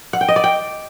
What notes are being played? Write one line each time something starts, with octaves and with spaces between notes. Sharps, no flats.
F#5
G5
D#5
D5
G5